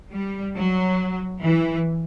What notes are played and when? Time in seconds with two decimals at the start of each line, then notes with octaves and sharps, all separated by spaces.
0.12 G3
0.55 F#3
1.43 E3